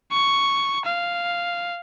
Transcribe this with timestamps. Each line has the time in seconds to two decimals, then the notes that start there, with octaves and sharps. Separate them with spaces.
0.11 C#6
0.85 F5